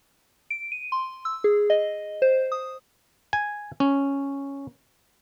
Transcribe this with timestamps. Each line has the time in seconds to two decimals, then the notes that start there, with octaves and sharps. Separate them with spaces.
0.50 D7
0.72 D#7
0.92 C6
1.25 E6
1.44 G#4
1.70 D#5
2.22 C5
2.52 D#6
3.33 G#5
3.80 C#4